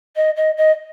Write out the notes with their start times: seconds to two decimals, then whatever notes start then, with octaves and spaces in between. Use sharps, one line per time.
0.16 D#5
0.37 D#5
0.57 D#5